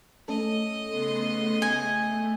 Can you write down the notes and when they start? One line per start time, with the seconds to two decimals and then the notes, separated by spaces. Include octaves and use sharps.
0.28 A3 C#4 A4 D#5
0.88 C#3 B3 C6
1.62 A3 G#5 G#6